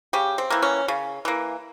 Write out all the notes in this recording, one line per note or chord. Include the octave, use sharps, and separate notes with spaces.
C#3 G4
C4
E3 A#3
C#4
C#3
E3 A#3